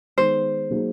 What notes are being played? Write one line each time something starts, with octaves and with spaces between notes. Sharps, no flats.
D#3 G#3 B3 C5
F#3 A#3 D#4 G#4